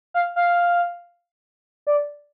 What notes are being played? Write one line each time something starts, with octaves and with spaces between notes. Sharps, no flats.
F5
F5
D5